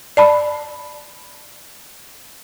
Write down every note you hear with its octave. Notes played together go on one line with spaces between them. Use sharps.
D5 A5 B5